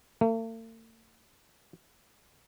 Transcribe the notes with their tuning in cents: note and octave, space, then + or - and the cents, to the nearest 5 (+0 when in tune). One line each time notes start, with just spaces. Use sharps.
A3 +45